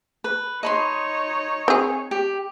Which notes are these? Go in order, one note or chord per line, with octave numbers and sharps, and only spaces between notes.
B4
D#4 C#5 D#5 B5 C6
C4 G#4
G4